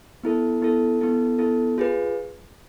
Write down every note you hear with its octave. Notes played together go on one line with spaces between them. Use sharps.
B3 E4 A4
B3 E4 A4
B3 E4 A4
B3 E4 A4
F4 G#4 B4